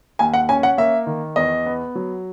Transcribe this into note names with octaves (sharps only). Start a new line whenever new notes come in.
D#2 G#5
F#5
C#4 G#5
F#5
A#3 E5
D#3
E2 D#5
B3
F#3